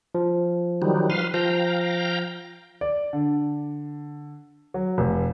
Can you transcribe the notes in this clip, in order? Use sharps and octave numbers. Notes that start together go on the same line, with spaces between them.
F3
D#3 F#3 G3
B4 F5 C6
F3 F5 G5 A#5
D5
D3
F#3
F1